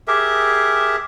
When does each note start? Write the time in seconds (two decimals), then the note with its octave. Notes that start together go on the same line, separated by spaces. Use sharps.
0.08 G4 G#4 A#4 E5